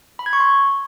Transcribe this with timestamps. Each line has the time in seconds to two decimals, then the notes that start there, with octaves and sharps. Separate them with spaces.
0.19 B5
0.26 G#6
0.33 C#6
0.40 C6